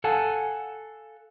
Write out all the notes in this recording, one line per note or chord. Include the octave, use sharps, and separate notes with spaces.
A4 F5 F#5 G#5 A5